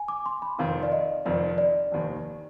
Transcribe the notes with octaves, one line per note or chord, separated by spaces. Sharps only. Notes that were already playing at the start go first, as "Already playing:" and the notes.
Already playing: G#5
D6
C6
B5
F1 F2 D#3 F5
D5
D#5
F1 F2 D#3 D5
D5
F1 D#2 D#3